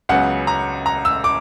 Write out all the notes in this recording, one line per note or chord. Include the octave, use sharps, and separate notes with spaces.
C#2 C#3 F#3 B3 F#5
A#5
A#5
E6
D6